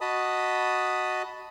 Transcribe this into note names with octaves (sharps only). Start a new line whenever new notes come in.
F#4 D#5 A5 B5 D#6